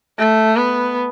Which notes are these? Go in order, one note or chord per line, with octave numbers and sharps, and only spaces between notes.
A3
B3